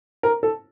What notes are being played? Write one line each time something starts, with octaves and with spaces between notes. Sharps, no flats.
A#4
A4